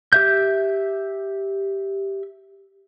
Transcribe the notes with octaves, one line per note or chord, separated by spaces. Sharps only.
G4 E5 G6